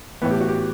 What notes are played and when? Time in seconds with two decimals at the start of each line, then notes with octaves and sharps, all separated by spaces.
0.22 A2 E3 B3
0.31 G4
0.41 F#4
0.48 G4